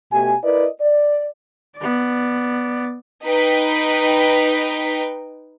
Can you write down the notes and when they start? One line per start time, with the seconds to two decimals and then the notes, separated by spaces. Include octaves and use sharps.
0.12 B2 A3 G4 G#5
0.43 E4 A#4 B4 D5 D#5
0.80 D5
1.78 B3 D5
3.24 D#4 B4 G5 B6